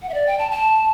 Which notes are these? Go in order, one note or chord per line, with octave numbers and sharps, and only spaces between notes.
F#5
E5
D5
G5
A5
A5